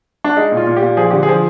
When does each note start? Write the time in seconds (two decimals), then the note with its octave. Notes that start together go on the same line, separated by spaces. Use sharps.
0.24 D4
0.37 G#3 D#4
0.52 A#2
0.57 F4
0.67 A#2
0.76 G4
0.82 A#2
0.97 F3 G#4
1.10 D3 G4
1.23 G#4
1.28 F3